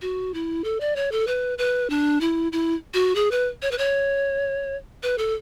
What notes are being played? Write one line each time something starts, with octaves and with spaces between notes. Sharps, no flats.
F#4
E4
A4
D5
C#5
A4
B4
B4
D4
E4
E4
F#4
G#4
B4
C#5
B4
C#5
B4
A4